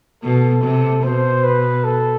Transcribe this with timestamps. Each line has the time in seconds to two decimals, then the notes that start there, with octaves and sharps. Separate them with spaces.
0.23 B2 A4
0.64 C3
1.03 B2 C5
1.44 B4
1.84 A4